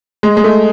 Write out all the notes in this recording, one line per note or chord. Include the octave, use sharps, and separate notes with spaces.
G#3
G#3
A3